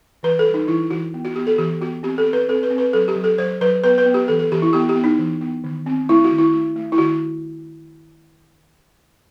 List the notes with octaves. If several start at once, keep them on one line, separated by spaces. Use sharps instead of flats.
E3 B4
A4
G3
D#4
E3 E4
E3 F#4
B3
F#4
B3 G4
A4
E3 G4
B3 F#4
C4 G4
A4
C4
B4
C4 A4
B4
C4
B4
F#3 A4
G4
F#3
A4
F#3 C5
F#3 B4
B3 B4
B4
B3
G4
E3 A4
A4
E3 G4
E4
B3 G4
G4
B3
D#4
E3
B3
D#3
C4
A3 E4
F#4
D#3
E4
A3
A3
E4
D#3 F#4